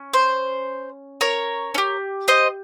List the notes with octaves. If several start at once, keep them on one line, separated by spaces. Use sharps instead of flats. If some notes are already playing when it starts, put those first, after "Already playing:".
Already playing: C#4
C5
A#4 C#5
C#4
G4
C5 D#5